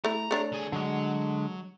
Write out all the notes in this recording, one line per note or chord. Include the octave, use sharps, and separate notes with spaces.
A3 E4 A#5
A3 D4 C#5
D3 G#4
D3 F#3 G#3